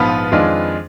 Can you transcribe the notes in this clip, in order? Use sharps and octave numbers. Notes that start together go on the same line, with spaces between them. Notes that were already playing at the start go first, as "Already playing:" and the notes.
Already playing: A#1 G#2 F3 B3 F4 B4
F2 D#3 G#3 D4 F4